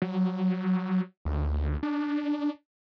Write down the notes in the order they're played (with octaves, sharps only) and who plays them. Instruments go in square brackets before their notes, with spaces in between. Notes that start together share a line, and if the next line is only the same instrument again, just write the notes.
[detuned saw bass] F#3
D2
D4